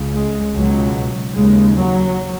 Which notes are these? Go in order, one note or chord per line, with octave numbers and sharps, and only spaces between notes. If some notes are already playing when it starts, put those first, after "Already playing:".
Already playing: C#2 C#3
G#3
C#2 B2 F#3
D#2 C#3 G#3
F#3